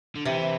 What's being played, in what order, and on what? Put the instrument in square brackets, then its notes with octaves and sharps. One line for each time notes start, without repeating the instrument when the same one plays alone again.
[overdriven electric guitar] D3
[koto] C3 [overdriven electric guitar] E3